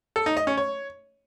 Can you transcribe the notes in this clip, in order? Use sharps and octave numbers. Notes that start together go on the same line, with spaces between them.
A4
D#4
D#5
C#4
C#5